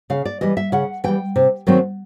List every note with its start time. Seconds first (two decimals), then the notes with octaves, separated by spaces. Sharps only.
0.10 C#3 F5
0.25 D5
0.41 E3 G3 D#5
0.57 E5
0.72 C#3 F#5
1.04 E3 G3 G5
1.36 C3
1.67 D#3 F#3 A3 C4